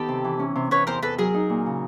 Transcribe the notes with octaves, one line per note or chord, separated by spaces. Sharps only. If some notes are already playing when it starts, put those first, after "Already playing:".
Already playing: D#3 B3 G4 A4
C3
E3
C#4
C3
C3 B4 C#5
E2 A#4 C5
E2 A4 B4
F#3 G#4 A#4
D#4
A#2
C#3